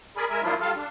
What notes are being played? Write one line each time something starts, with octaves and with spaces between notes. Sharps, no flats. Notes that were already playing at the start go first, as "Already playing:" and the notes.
G#4 A#4 D5 G#5 B5
G#3 A#4 E5 G#5
F3 F#3 A#3 D4 E4 F4
G3 F4 A4 F5
D4